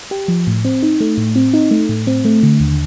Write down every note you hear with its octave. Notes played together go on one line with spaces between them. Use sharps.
G4
F3
A2
C4
D#4
A3
A2
C4
D#4
A3
A2
C4
A3
D3
D#2